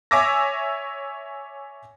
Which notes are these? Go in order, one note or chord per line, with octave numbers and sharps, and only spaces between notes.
C#5 E5 G#5 D6 E6 A#6